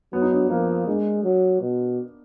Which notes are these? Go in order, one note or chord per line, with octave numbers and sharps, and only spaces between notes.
F#3 B3
D#4
D4
F3 A#3
G#3 D4
F#3
B2